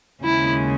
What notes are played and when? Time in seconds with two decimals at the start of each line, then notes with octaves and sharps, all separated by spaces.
0.23 D#2 C#3 G#3 E4